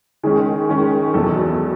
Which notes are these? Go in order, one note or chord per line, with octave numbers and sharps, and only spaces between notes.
D#3 G#3 C#4 G#4
D#3 G#3 C#4
E2 B2 F#3 A4